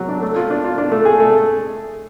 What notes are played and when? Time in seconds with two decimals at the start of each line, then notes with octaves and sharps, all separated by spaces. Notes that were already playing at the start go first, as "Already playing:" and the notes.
Already playing: F#3
0.09 D4
0.21 A3
0.36 F4
0.50 D4
0.64 F4
0.78 D4
0.92 A3
1.05 G#4
1.20 A3